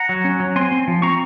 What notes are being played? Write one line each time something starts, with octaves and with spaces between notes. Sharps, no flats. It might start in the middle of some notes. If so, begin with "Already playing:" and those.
Already playing: F#5 A#5
F#3
C#4
F#3
C4 G#5 C6
C4
F3
C4 A#5 C#6